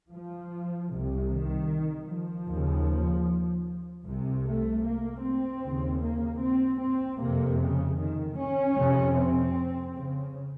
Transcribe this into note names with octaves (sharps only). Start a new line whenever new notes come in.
F3
C2 C3
D#3
F3
D#2 C#3
C2 C3
A3
A#3
C4
D#2 C#3
A#3
C4
C4
F2 C3 A#3
C#3
D#3
C#4
F2 C3
C4
C#3